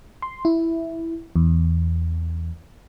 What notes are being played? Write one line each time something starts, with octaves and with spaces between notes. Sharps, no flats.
C6
E4
E2